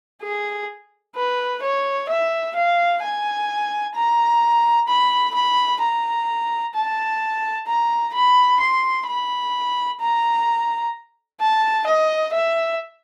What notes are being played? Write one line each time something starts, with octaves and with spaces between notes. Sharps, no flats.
G#4
B4
C#5
E5
F5
G#5
A#5
B5
B5
A#5
A5
A#5
B5
C6
B5
A#5
A5
D#5
E5